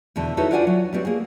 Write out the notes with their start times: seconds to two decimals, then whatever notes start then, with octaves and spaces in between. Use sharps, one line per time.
0.16 E2 B2 D3 A4
0.37 D#4 E4 F#4 A4 B4 C#5
0.51 D4 F4 F#4 D5 F#5 G#5
0.67 F#3
0.93 G3 B3 C4 F#4
1.05 A#3 G#4